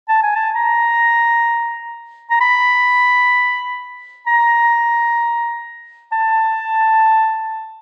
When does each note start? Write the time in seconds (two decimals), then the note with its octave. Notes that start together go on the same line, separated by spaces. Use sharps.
0.09 A5
0.23 G#5
0.35 A5
0.55 A#5
2.30 A#5
2.41 B5
4.27 A#5
6.12 A5